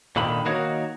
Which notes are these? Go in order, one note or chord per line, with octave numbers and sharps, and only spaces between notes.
A#2 D3 D#3 B5
D#3 A#3 D#4 F#4 C#5